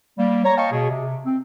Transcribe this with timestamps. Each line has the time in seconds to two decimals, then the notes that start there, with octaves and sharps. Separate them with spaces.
0.18 G3 A#3
0.44 C#5 A#5
0.57 C#5 D#5 F5 G5 A5 C#6
0.71 B2 G#4
0.90 C3
1.25 C4